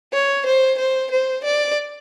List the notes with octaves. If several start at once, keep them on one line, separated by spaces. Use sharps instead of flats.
C#5
C5
C5
C5
D5